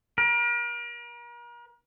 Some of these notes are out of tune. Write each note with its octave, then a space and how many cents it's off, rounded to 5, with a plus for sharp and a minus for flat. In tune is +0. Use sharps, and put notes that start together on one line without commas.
A#4 +40